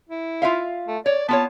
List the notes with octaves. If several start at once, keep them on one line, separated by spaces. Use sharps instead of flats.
E4
F4 E5 F5
A3
C#5 D5
B3 F4 C#5 A5